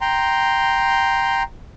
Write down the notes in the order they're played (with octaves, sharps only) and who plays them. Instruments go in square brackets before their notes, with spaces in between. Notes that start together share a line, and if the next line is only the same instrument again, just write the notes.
[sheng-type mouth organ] G5 A#5 C6